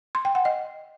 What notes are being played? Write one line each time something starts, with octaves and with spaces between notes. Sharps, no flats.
C6
G5
F#5
D#5